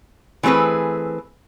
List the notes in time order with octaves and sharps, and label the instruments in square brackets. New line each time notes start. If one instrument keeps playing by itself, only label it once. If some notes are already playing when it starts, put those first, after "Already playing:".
[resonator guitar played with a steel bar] E3 A3 C4 G#4 B4